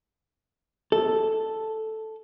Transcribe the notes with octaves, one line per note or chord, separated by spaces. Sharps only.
A4